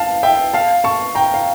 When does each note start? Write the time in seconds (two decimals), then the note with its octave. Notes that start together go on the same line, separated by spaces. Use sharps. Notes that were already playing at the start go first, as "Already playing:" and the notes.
Already playing: F5 A5
0.23 E5 G5
0.53 F5 A5
0.84 A5 C#6
1.15 G5 A#5
1.34 F5